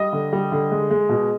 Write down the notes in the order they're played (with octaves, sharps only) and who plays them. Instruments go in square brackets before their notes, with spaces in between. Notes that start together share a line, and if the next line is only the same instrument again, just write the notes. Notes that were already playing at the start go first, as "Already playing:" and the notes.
Already playing: [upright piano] G3 D#5
D3
G3
D3
G#3
G#3
B2